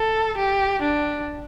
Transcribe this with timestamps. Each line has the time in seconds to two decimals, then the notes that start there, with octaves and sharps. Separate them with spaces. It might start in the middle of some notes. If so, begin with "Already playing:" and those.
Already playing: A4
0.37 G4
0.82 D4